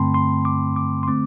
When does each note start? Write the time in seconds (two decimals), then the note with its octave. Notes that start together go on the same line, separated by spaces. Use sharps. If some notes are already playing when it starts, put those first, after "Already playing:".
Already playing: G2 D3 A3 C4 G5 A5 B5 C6
0.14 C6
0.45 D6
0.76 D6
1.03 C6
1.08 D3 A3 C4 D6